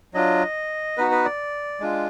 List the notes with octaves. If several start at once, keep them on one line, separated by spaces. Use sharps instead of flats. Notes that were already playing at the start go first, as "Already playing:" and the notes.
F#3 D4 F4 D#5
B3 D#4 F#4 B4
B4
D5
G#3 D4 F4